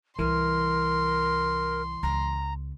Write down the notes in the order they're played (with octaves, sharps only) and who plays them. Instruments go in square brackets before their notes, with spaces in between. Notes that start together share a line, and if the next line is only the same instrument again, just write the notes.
[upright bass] C2 [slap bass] E3 [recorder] A#4 [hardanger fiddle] C6
[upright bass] C#2 [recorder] A#5